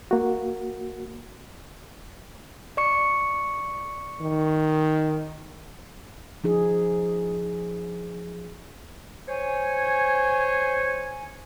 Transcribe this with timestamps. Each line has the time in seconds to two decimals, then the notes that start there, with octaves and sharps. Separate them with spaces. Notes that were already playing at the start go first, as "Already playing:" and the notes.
0.11 A#3 F#4
2.77 D5 C#6 C#7
4.21 D#3
6.44 F3 D#4 G#4
9.28 C5 C#5 G#5